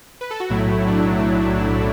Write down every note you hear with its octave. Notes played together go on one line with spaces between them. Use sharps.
B4
A4
F#4
B1 A2 F#3 A3 E4
D4